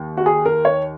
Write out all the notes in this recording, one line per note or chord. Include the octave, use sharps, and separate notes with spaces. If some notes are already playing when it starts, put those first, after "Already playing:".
Already playing: D#2
F#4
G#4
A#4
C#5